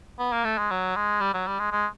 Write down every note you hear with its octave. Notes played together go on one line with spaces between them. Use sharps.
B3
A#3
A3
G#3
F#3
G#3
G3
F#3
G3
G#3
G#3